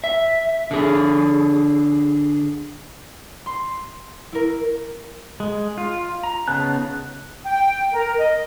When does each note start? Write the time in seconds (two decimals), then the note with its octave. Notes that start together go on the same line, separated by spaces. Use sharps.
0.04 E5
0.71 D3 G#4
3.46 C6
4.33 E4 A#4
5.40 G#3
5.78 F4
6.23 A#5
6.48 C#3 B3 D#4 A5 F#6
7.46 G5
7.94 A#4
8.18 D#5